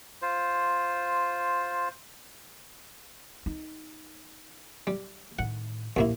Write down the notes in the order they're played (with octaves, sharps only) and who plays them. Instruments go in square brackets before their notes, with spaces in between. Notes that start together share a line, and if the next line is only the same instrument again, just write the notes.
[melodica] F4 C5
[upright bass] D#4
[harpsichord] G3
[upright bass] A2 D#3 [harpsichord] F#5
[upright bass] A#1 [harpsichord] D#2 A#3 E4